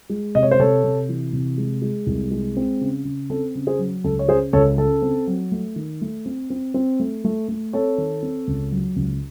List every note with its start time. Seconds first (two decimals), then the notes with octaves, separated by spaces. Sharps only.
0.10 G#3
0.35 C3 D#5
0.43 C#5
0.51 C5
0.59 C3 A4 C#5
0.84 C3
1.09 E3
1.33 C3
1.58 G#3
1.82 G#3
2.07 C2
2.31 G#3
2.57 C4
2.81 C#3
3.05 C#3
3.30 C4 A4
3.55 C#3
3.67 G#4 C5
3.79 F#3
4.04 C#2 A4
4.19 C#5
4.29 C#3 G#4 C5
4.53 C#2 A4 C#5
4.78 C#3 A4
5.02 C4
5.27 F#3
5.52 A3
5.76 D#3
6.01 A3
6.26 C4
6.50 C4
6.74 C4
7.00 A3
7.25 A3
7.49 A3
7.73 C4 A4 C#5
7.98 D#3
8.23 C4
8.47 C#2
8.72 F#3
8.96 C#2